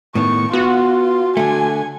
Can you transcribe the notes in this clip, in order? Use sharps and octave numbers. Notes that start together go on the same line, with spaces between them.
A2 D#3 B3 C#6
B3 F4 F#4
D3 A3 G#5